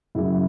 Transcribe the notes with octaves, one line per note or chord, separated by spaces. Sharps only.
F#2 C#3 F#3 E4